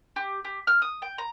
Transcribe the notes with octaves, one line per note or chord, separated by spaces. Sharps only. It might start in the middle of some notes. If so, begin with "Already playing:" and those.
G4
G4
F6
D#6
G5
A#5